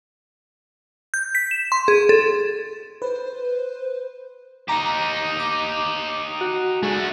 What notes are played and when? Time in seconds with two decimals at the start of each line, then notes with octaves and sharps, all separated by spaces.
1.14 G6
1.35 B6
1.51 E7
1.72 C6
1.88 G#4
2.09 A4
3.02 B4 C5
4.69 D#4 G4 A#5
5.40 D6
6.41 F#4
6.83 G#3 A3 F#4